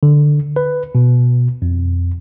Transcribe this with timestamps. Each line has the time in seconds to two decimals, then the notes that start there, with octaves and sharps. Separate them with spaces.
0.03 D3
0.56 B4
0.95 B2
1.62 F2